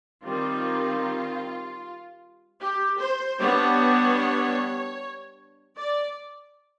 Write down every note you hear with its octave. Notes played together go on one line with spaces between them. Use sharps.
D#3 G3 C4 F4
G4
C5
G3 B3 D4 C#5
D5